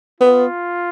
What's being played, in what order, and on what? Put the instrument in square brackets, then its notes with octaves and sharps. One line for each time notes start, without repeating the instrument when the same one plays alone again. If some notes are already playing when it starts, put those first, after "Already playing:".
[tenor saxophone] B3 [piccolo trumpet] F4